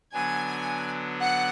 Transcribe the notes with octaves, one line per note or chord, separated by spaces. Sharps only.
D3 F#3 B3 D4 G#5
F#5